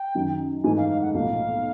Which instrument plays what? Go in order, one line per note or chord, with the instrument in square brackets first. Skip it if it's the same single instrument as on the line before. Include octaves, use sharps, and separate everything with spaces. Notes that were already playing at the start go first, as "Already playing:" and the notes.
Already playing: [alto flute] G5
[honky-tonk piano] F#2 D#3 F#3
[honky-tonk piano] G#2 E3 A3 [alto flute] G#5
[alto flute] F5
F5
F#5
[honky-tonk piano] B1 A#2 F3 A3 [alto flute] F5